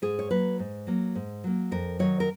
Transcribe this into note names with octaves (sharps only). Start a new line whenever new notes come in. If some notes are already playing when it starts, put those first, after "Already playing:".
G#2 G#4
C#5
F#3 A#3 B4
G#2
F#3 A#3
G#2
F#3 A#3
F2 A#4
D#3 F#3 C#5
A#4